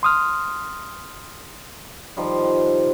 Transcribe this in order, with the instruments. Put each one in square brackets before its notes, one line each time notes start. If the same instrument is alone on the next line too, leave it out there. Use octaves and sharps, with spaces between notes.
[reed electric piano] C6 D#6 F6
[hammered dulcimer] D#3 F3 G3